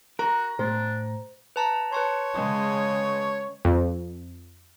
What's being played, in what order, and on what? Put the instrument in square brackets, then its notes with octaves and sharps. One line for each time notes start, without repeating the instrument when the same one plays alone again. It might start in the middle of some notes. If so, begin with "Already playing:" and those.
[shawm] F#4 [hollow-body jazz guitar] A#4 [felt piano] A#5
[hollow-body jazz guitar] A2 [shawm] D4 [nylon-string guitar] C5
[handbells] B4 A5 A#5
[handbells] B4 A5 C6 [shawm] C#5
[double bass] C#3 G#3
[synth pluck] F2